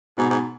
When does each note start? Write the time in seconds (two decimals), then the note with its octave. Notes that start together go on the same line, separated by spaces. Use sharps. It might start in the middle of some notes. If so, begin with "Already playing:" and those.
0.18 G#2 B2
0.30 G#2